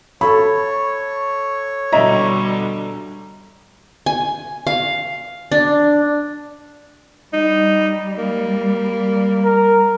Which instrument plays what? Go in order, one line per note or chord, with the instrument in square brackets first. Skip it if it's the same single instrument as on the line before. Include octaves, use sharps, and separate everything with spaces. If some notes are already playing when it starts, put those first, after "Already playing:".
[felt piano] A4 B5 [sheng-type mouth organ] C#5
[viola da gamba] B2 D3 G3 [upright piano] D#5 E5 A#5
[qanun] G#5
F5
D4
[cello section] G3 [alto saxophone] D#4
[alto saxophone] A#3
[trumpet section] A#4